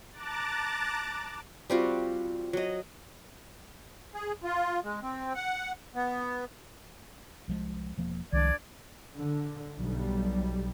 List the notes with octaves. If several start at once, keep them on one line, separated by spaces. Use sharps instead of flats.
A5 A#5 D6 F#6 A6
G3 C4 F4 F#4
F#3 D#5
G#4
F4
G#3
C4
F#5
B3
C2 F3 G#3
E1 F3 A#3
C2 D#3 F3 G#3 D4 D5 G#6
D3
B1 G3